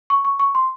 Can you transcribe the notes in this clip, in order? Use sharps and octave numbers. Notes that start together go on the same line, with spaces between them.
C#6
C#6
C#6
C6